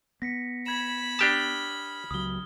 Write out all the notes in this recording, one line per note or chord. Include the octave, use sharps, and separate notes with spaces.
B3 A#6 B6 C#7
B5 G#6 E7
D4 G4 A5 D#6 F6 G7
C#2 F#3 D#6 G7